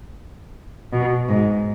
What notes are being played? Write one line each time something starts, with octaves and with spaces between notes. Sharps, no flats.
B2
G#2